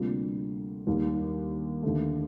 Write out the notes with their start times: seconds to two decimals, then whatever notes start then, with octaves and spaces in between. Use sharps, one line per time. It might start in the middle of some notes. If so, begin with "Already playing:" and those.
Already playing: D2 C3 G3 A#3 F4
0.87 D#2 D#3 G3
1.83 D#2 D3 A3